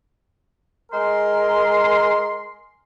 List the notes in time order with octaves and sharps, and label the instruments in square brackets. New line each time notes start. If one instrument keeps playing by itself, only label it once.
[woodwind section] G#3 A#4 C6